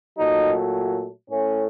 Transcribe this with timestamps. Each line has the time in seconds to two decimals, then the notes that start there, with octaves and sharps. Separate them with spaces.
0.18 A#2 F#3 A3 D#4
1.30 A2 A3 C#4